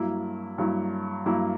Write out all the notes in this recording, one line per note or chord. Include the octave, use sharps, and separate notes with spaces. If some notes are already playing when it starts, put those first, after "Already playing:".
Already playing: G2 F#3 A#3 E4
G2 F#3 A#3 E4
G2 F#3 A#3 E4